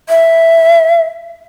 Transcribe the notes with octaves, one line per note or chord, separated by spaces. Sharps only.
E5